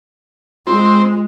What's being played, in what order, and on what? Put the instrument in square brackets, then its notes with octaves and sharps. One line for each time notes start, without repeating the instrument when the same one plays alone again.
[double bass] G#3 [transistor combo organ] C4 [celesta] F4